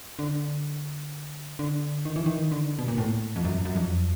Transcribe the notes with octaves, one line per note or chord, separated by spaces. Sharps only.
D3
D3
D#3
E3
D#3
D3
B2
A#2
A2
F2
F#2
F#2
F2